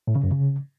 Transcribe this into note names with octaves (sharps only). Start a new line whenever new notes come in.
A2
C#3
F#2
C#3